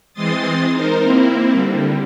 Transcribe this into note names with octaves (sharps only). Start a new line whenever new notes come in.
E3 G#3 C4 C6 D#6 A6
D#4 A#4 C5
A#3 C4 E4
D3 G3